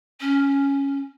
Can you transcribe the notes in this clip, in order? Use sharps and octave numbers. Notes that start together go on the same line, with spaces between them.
C#4